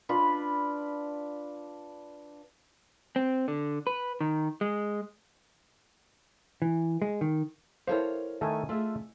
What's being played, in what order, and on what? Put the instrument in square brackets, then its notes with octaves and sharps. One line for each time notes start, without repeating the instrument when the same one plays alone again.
[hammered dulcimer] D4 F4 B4 B5
[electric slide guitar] C4
D3
B4
D#3
G#3
[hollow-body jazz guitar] E3
G#3
D#3
[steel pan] E4 A4 C5 [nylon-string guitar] A#4 C#5 F5
[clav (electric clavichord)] D#3 A3 A4 [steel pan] D#5 G#5
[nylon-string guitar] A3 G#4 [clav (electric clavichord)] F4 E5